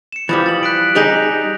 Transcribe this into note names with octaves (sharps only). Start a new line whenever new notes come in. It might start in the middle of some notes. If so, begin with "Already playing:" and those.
C#7 E7
E3 F3 G3 D6 D#6 A6
A6 F#7
F#6 B6 D7
G3 D#4 G#4 G6 A#6 F7